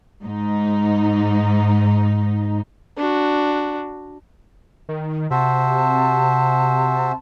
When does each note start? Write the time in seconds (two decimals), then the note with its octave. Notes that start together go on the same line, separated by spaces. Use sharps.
0.23 G#2 D#4
2.97 D4 F#4
4.89 D#3
5.31 C3 F#4 C5 E5 A5